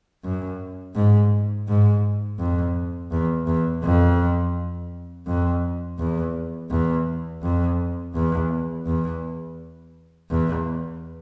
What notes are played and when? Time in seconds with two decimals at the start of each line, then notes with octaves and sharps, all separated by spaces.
0.24 F#2
0.95 G#2
1.68 G#2
2.40 F2
3.12 E2
3.47 E2
3.83 F2
5.27 F2
5.99 E2
6.71 E2
7.43 F2
8.15 E2
8.87 E2
10.31 E2